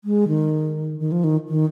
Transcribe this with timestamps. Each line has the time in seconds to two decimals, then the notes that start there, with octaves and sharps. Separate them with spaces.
0.04 G#3
0.28 D#3
1.00 D#3
1.12 F3
1.24 D#3
1.48 D#3